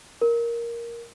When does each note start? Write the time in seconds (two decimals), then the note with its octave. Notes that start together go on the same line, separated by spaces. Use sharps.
0.21 A#4